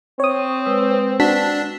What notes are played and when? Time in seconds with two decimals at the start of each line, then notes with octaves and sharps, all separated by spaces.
0.20 C4 C#5 D#6
0.66 G#3 B4 E6
1.20 D4 F#4 B6